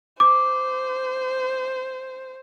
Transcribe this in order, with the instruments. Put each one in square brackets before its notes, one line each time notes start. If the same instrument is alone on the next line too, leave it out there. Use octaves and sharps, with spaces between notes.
[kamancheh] C5 [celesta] D6